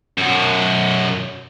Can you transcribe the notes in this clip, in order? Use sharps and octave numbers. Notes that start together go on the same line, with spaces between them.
F#2 B2